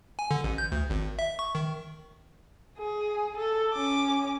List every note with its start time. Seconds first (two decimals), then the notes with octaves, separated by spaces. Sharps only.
0.19 G#5
0.31 D3
0.44 A1
0.58 G6
0.72 D2
0.90 G#1
1.19 E5
1.39 C#6
1.55 D#3
2.78 G#4
3.37 A4
3.73 C#4 D6